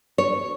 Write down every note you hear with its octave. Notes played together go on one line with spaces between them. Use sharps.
C#5